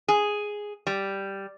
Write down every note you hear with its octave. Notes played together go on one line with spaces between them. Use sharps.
G#4
G3